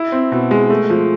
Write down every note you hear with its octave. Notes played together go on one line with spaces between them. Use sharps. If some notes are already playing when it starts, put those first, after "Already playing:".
Already playing: E4
C4
B2
G#3
A3
F3